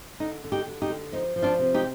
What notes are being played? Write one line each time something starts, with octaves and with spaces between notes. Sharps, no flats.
D3 D#4
D3
D#4 G4
D3
D#4 G4
D3
F3 D#4
F3
D4 F4
C3
D#4 G4